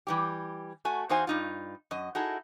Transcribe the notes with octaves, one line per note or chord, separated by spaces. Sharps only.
E3 G3 G4
A3 F#4 G#5
E2 D#4 F#4 C5 F5 G#5
G2 D#4 F4
F#2 D#5
D#4 E4 F#4 G#4 A4